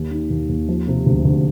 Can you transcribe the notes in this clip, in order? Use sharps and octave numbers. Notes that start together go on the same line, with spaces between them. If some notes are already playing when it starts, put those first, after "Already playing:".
Already playing: D#2
D#3
D#2
D#2
F3
C3
D2
D2